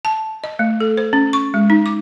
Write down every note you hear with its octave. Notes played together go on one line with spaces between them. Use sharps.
A5
D#5
A3
A4
C5
C#4
C#6
G#3
D#4
D6